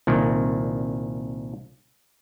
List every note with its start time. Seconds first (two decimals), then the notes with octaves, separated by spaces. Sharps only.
0.07 C2 A#2 D#3